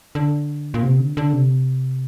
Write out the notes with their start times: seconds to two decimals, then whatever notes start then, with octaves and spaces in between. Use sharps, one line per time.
0.15 D3
0.74 A#2
0.83 C3
0.99 D3
1.17 D3
1.33 C3